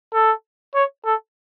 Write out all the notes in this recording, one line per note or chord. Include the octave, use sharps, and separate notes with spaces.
A4
C#5
A4